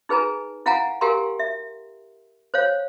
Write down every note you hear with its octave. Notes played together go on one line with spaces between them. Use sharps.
D#4 G#4 B4 G#5 A#5
E4 F5 F#5 G#5 A#5
G4 A#4 F5 G#5 A#5 C6
E5
C5 C#5 F5